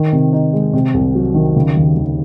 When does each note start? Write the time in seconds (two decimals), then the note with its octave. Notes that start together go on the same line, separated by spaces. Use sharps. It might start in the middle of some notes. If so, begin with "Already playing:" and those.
Already playing: D#3
0.12 C3
0.33 D#4
0.53 G#3
0.73 C3
0.94 C2
1.15 F#3
1.35 D#3
1.56 C#3
1.76 D#2
1.96 D#2